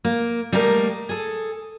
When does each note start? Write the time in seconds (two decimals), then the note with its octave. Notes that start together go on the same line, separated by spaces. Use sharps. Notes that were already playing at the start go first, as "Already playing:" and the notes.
0.05 A#3
0.52 G3 A3 A#3 G#4 A#4 D#5
1.09 G#4 A4